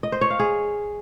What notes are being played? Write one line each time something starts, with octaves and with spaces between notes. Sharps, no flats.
D#5
C5
C#5
F5
G#4